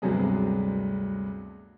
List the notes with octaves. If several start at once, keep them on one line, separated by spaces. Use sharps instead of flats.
D2 G2 C3 F#3 G#3 B3